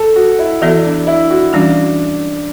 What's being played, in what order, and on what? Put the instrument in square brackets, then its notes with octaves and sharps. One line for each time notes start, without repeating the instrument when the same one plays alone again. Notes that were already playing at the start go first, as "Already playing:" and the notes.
Already playing: [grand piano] A4
F#4
E4
[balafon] E3 B3 F#4 A4 D5 [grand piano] E4
[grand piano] D4
E4
F#4
[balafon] E3 G3 C#4 F#4 [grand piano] D4